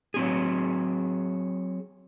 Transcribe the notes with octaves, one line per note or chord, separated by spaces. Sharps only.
F#3 C4 G#4